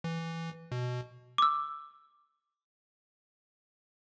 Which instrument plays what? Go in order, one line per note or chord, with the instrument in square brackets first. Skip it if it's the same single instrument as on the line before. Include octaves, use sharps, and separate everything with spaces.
[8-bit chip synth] E3
B2
[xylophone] D6 E6